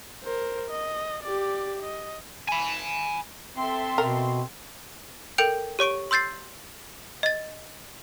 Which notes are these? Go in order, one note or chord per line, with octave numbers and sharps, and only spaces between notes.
A#4 C5
D#5
G4 D5
D#5
G#5 B5
C4 A4 E5 C6
B2 A#4
A4 A#4 G5 G6 D7 F7
G4 C#5 C#6 D7
C6 E6 G6 A6 C7
D#5 A6